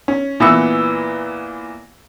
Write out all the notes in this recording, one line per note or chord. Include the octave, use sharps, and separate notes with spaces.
C#4
A#2 E3 B3 B4 E6 C#7